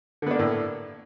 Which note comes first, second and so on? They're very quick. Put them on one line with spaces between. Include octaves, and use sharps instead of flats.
D3 B3 D4 A#3 A2